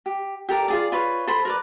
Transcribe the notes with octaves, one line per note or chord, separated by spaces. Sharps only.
G4
G4 A4 A#4 D5
F4 G#4 D5
F4 B4 C#5
A4 C5 B5 C6
A#4 B4 D5